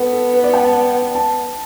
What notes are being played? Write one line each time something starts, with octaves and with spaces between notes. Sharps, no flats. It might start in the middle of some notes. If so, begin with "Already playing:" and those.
Already playing: B3 A4 B4
A4
B4
D5
G5
A5
A5